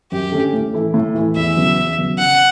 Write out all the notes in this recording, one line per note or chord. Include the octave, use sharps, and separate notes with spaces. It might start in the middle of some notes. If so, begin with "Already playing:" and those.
F#2 G4
D3 A3 C#4
A2
E3 A3 E4
A2
E3 A3 E4
E2 E5
C#3 F#3 B3
E2
C#3 F#3 B3
C#3 F#5